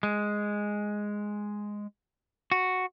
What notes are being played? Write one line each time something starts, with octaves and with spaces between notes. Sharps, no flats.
G#3
F#4